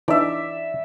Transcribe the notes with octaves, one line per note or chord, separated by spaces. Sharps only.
E3 D4 D#4 D5 E5